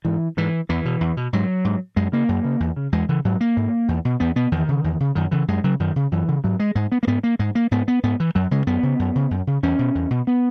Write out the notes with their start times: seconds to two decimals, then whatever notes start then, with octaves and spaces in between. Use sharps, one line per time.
0.05 G#2 E3
0.37 G#2 E3
0.69 E2 E3
0.85 B2
1.01 E2
1.17 B2
1.33 G#2 F#3
1.65 G#2
1.96 F#2 G#3
2.12 C#3 A#3
2.29 F#2
2.44 C#3
2.60 E2
2.76 C#3
2.92 E2 G#3
3.09 C#3 E3
3.25 G#2 F#3
3.41 A#3
3.57 G#2
3.88 E2
4.05 B2
4.20 E2 B3
4.36 B2 B3
4.52 E2 D#3
4.69 C#3
4.84 E2
5.00 C#3
5.15 F#2 D#3
5.31 C#3 E3
5.48 F#2 G#3
5.64 C#3 F#3
5.80 F#2 D#3
5.96 C#3
6.12 F#2 E3
6.28 C#3
6.44 G#2 F#3
6.60 G#3
6.75 G#2 G#3
6.92 B3
7.03 A#3
7.07 G#2 B3
7.23 A#3
7.39 G#2 G#3
7.55 A#3
7.71 G#2 B3
7.88 B3
8.03 G#2 B3
8.20 E3
8.35 F#2 F#3
8.51 C#3 G#3
8.67 F#2 B3
8.83 C#3
8.99 F#2
9.15 C#3
9.31 F#2
9.47 C#3
9.63 E2 C#4
9.79 B2
9.95 E2
10.11 B2
10.27 B3